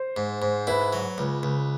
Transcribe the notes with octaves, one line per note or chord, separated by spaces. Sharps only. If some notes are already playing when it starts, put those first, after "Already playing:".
Already playing: C5
G#2
G#2
E4 B4
F#3
C#2
C#2